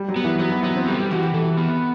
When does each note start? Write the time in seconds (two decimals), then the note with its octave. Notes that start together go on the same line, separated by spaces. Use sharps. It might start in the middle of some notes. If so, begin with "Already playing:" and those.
Already playing: G3
0.08 F#3
0.16 B3
0.24 E3
0.39 F#3 B3
0.51 E3
0.63 F#3 B3
0.76 C4
0.86 G3 G4
0.99 G4
1.11 E3 F#4
1.23 G4
1.34 E3 A4
1.57 B3